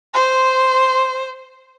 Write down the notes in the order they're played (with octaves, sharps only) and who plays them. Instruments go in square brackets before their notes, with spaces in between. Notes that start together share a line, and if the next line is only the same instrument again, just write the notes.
[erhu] C5 [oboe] C6